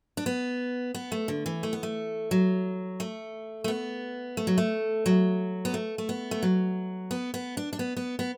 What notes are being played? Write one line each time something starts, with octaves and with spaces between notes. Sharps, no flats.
D4
B3
B3
A3
D3
E3
A3
B3
A3
F#3
A3
A3
B3
A3
F#3
A3
F#3
B3
A3
A3
B3
A3
F#3
B3
B3
D4
D4
B3
B3
B3